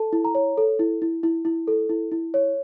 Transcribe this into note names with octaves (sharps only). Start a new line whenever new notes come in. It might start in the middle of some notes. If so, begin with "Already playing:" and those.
Already playing: A4 A5
E4
A#5
C#5
A4
E4
E4
E4
E4
A4
E4
E4
C#5